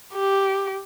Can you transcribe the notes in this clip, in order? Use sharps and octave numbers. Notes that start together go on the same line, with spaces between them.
G4